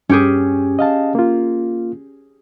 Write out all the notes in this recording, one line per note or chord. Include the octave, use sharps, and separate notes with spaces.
G2 C#4 G4 G#4
D#5 F5 A5
A#3 F4